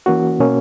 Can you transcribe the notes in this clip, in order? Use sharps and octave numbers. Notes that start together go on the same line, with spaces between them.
E3 A#3 C#4 F#4
B2 A#3 C#4